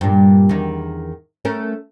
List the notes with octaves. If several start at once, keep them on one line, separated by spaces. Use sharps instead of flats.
G2 A#2
E2 D#3
A3 C#4 A#4